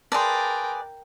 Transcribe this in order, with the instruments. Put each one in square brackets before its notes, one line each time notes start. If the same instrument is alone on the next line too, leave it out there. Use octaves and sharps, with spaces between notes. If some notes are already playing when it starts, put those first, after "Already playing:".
[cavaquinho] G#4 B4 D5 [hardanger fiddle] A#4 G5 [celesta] A5 C6